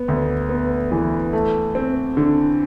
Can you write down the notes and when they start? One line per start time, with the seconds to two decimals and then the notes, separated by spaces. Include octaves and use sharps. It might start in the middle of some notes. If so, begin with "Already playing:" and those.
Already playing: B3
0.08 D2
0.49 B3
0.92 E3
1.33 A3
1.75 C4
2.17 D3